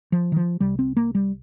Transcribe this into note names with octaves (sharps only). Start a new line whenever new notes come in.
F3
D#3
F3
C2 C3 G3
C4
A#3
G3